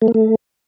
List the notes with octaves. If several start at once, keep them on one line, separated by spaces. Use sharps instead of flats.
A3
A#3
A3